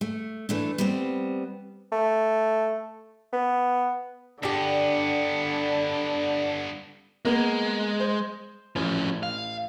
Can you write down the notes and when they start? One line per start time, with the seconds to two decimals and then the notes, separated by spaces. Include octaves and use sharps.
0.01 A3
0.49 E3 A3 D4
0.78 G3 B3 C4
1.92 A3
3.32 B3
4.43 G2 D3 B3 D4 G4
7.25 G#3 A#3 B3
8.00 C5
8.76 A1 F3 C#4
9.23 F5